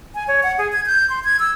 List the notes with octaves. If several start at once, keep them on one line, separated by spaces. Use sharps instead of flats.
G#5
C#5
F#5
G#4
G#6
G6
C6
G#6
E6